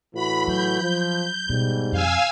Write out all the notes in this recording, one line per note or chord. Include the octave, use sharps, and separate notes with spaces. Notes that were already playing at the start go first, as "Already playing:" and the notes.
A2 E3 F#4 B5
F#3 G6
F3
G#2 B2 G3
F2 F5 G#5 E6